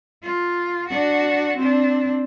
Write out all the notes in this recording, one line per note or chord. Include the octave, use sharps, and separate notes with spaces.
F4
D4 F#4
C4 D4